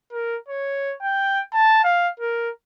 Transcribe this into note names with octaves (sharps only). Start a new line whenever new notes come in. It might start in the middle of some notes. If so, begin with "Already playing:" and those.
A#4
C#5
G5
A5
F5
A#4